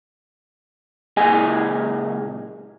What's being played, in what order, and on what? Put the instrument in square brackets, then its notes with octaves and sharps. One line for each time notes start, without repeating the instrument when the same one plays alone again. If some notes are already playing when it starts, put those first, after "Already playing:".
[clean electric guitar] C#2 A#2 G#4 D#5 G#5